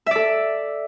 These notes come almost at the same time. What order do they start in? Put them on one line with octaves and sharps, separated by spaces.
E5 D5 A4